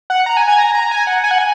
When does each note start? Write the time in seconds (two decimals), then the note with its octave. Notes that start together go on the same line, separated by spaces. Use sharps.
0.10 F#5
0.26 A#5
0.37 G#5
0.48 G#5
0.58 A#5
0.75 A#5
0.91 G#5
1.07 F#5
1.24 G#5
1.31 F#5
1.38 G#5